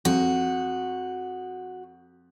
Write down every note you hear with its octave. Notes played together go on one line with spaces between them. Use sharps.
F2 F#4